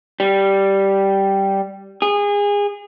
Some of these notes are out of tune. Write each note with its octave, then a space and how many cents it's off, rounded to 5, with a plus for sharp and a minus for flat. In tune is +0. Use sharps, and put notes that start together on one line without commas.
G3 -5
G#4 -25